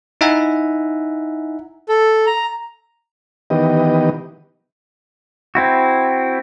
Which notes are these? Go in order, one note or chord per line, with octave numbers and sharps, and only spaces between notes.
D#4 E4 E5 F#5 G#5 A#5
A4
A#5
D#3 E3 B3 G4 D#5
C4 E4 F#4